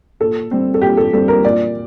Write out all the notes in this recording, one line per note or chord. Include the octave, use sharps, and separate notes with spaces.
A#2 A4
G3 C4
A4
A#2 G4
A4
G3 C4 A4
A#4
A#2 D5